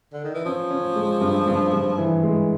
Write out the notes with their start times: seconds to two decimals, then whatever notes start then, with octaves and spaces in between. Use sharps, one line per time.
0.13 D3
0.24 D#3
0.35 E3
0.45 F3 C#4
0.71 C#4
0.96 G#3
1.21 G2
1.48 G2
1.73 G2
1.98 E3
2.23 G#3